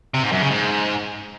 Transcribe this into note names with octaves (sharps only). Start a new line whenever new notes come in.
C3
G#2
F#2
C#3
G#2